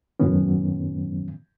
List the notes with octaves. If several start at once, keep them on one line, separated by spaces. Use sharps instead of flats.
F#2 A2 D#3 F#3 B3 C#4